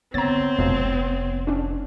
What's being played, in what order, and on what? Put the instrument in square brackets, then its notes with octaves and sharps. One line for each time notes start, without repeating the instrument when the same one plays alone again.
[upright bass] D3 [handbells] B3 C#5 [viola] C4 [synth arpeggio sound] A#5 A6
[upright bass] F1 [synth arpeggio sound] F2 B2 F3
[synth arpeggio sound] C#4 D4